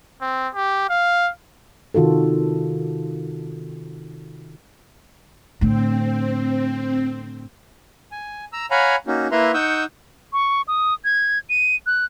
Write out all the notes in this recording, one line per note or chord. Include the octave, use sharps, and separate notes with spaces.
C4
G4
F5
C3 D#3 F4 F#4 A4
A2 D3 C4
G#5
A#5 E6
C#5 F5 F#5 G#5 A#5 B5
A#3 C#4 D#4 F#4
A#3 E4 B4 E5 A#5 C6
D#4 F#5 C#6 D#6 E6 G6
C#6
D#6
G#6
D#7
F#6